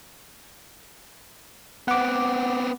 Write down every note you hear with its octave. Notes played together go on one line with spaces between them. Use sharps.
B3 C4 F#5 D6